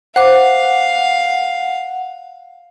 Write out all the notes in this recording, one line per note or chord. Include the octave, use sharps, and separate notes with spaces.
C5 F5 F#5 D6